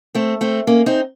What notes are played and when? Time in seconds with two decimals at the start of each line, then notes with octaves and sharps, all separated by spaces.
0.15 A3 C4
0.41 A3 C4
0.67 A#3 C#4
0.86 C4 D#4